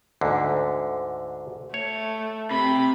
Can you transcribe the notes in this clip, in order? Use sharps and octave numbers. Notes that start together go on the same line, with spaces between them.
D2 G#2 D3
A3 C#5
C3 B5